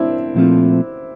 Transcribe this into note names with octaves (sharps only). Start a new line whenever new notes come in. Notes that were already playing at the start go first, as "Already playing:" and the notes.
Already playing: C4 D4 E4
A#2 F3 A3 C4 F4